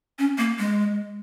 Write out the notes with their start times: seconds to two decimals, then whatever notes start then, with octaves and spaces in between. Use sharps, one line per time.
0.19 C#4
0.38 A#3
0.59 G#3